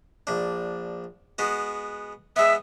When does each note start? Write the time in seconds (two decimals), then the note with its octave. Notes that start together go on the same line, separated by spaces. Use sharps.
0.27 A#1 D4
1.38 G#3 B3 F#4
2.36 G#3 B3 E5